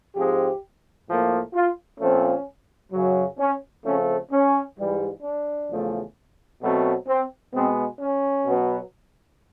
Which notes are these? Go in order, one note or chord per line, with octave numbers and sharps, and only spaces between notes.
G#2 F3 G#3 C4 G4
A2 F3 A#3
F4
A#2 F3 A3 C4 C#4
F#2 C#3 F#3
C#4
C#3 F3 A3 C4 C#4
C#4
G#2 E3 G3
D4
E2 C#3 F3 A3
B2 F#3 A3 C4
C4
B2 G#3 B3 C4
C#4
B2 F#3 B3